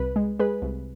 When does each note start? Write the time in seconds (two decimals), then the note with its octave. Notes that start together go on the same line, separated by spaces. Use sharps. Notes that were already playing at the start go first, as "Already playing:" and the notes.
Already playing: C2 B4
0.16 G#3
0.40 G#3 G#4 B4
0.62 C2